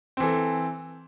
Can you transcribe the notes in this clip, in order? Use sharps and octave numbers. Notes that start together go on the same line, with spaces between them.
E3 C4 A4